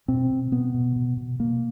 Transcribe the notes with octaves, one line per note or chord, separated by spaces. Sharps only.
B2 C4
B2
B2 B3
B2
B2
B2
B2 A#3